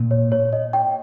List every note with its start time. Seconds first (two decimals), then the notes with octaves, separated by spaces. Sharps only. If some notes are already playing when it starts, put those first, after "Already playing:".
Already playing: A#2
0.11 C#5
0.32 C#5
0.53 D#5
0.73 G5